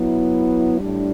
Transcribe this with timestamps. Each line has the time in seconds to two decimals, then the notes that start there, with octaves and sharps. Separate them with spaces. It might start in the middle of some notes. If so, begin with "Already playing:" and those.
Already playing: F#3 B3 E4
0.80 A2 G3 D4